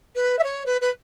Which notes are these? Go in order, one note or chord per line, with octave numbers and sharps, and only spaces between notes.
B4
E5
C#5
B4
B4